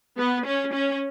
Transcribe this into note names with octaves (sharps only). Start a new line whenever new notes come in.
B3
C#4
C#4